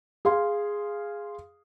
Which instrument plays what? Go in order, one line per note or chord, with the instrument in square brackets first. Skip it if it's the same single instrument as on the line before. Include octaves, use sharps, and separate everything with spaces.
[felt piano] G#4 F5 C6